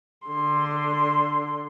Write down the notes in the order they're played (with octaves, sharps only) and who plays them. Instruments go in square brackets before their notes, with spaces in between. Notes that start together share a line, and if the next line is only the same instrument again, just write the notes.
[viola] D3 C6